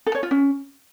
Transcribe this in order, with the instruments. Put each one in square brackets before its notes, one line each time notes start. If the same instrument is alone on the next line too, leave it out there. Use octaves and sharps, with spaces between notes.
[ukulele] A4
C#5
F4
C#4